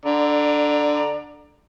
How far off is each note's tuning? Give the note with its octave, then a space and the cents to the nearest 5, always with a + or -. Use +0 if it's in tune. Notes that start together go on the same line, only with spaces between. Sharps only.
D3 +0 D5 +20 A#5 +5